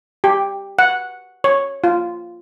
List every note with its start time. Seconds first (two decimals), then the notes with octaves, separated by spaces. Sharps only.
0.24 G4
0.79 F#5
1.44 C#5
1.84 F4